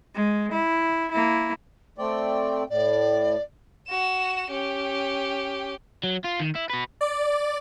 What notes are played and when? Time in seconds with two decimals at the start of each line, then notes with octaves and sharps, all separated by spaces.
0.15 G#3
0.53 E4
1.13 A#3 E4
1.98 A3 C4 D5 G5
2.70 A2 D5
3.88 F#4 E7
4.51 C#4 G4
6.03 F#3
6.24 F4
6.40 D#3
6.55 E4
6.70 F#4 B4
7.01 D5